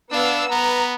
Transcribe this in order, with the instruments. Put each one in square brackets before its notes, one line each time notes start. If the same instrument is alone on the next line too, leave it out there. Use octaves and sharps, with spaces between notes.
[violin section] B3 F5 E6 [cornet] D4
[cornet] B3 [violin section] B4 A#5